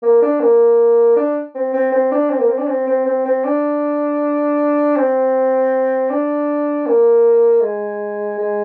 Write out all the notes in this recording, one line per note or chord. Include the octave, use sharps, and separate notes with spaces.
A#3
D4
A#3
D4
C4
C4
C4
D4
C4
A#3
C4
D4
C4
C4
C4
C4
D4
C4
D4
A#3
G#3
G#3